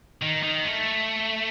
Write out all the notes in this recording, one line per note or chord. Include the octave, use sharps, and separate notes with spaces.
D#3
D#3
A3